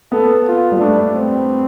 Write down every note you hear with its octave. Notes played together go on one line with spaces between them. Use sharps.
B3 A4
F4
G3
A3 D4
C4